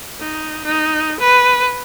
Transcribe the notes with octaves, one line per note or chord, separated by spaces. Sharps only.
D#4
D#4
B4